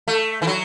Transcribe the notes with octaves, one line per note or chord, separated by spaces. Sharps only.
A3
E3
F#3